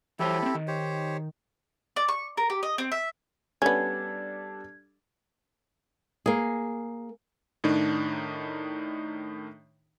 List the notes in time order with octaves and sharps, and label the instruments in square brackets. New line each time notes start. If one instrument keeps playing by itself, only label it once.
[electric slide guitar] E3 F#3 C5 [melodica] E4 G4 A4
[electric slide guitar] B3 C4
D#3
[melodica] G4 C5 C#5
[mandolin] D5
C#6
A#4
G4
D#5
C4
E5
[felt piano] G3 D4 A4 [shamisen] B3 C#4 [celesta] G#6
[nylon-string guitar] A#3 G#4
[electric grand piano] A2 D#3 D4 D#4